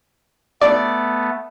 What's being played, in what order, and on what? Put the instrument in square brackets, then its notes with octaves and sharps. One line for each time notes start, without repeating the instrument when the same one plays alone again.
[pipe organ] A3 B3 [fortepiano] D5